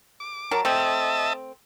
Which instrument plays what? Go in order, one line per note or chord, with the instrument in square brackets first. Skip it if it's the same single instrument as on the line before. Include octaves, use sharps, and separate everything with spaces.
[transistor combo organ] D6
[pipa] F#3 A#4 A5
[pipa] A3 C4 [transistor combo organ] D#5 E5 A5